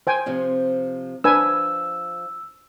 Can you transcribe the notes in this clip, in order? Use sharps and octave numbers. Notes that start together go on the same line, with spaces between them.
C5 G5 G#5
C3 F3 C4
F3 D4 B4 G#5 E6